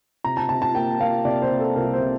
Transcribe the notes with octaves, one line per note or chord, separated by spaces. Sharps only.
C3 A#5
A5
C3 A5
A5
A#3 G5
A#3 F5
C3 D5
C5
C3
A4
C2 A#4
C5
C3